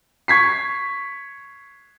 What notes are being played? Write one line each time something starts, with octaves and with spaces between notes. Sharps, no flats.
C#6 G#6 B6 C7